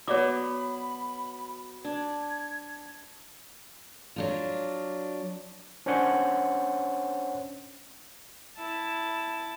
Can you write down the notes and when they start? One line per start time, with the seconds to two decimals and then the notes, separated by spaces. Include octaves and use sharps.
0.08 F#3 B3 C#5 D5 B5 D6
1.85 D4 G#6
4.16 F#3 D4 F4
5.86 C#4 D4 C5 C#5 F#5
8.57 E4 A5